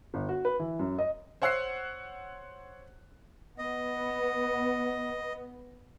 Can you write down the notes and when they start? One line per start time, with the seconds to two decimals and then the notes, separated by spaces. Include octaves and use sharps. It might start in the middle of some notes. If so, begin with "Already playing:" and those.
0.14 G1
0.29 F#4
0.45 B4
0.59 E3
0.79 F#2
0.99 D#5
1.42 C5 C#5 F#5 E6 F#6 C7
3.58 B3 D#5